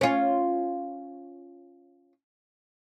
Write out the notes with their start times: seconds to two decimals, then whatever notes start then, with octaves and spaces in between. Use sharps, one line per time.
0.01 C#4 F4